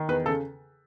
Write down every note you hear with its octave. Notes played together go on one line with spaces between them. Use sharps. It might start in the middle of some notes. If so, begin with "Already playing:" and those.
Already playing: D#3
E2 B4
C#3 A4